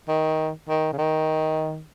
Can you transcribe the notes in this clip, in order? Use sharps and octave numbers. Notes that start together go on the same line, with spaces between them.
D#3
D#3
C#3
D#3